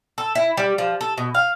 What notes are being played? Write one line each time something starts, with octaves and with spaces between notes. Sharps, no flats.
A4
E4
G3
F3
A4
B2
F5